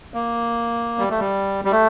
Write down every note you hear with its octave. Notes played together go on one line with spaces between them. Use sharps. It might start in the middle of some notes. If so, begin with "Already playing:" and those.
A#3
G3
A3
G3
G3
A3